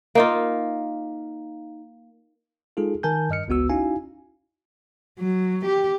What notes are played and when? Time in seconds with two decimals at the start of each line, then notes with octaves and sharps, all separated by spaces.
0.15 A#3 D#4 F4
2.77 G#3 D#4 F4 G#4 A4
3.03 D#3 A#4 G#5 A5 G6
3.30 G2 D#5 F6 C#7
3.48 G1 C#2 B3 F#4 E6
3.69 C#4 D#4 E4 F#4 F5 G#5
5.19 F#3
5.66 G4